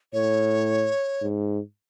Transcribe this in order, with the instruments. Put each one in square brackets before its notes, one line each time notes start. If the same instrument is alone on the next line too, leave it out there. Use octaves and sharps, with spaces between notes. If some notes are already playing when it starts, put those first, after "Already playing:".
[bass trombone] A2 [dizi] C#5
[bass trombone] G#2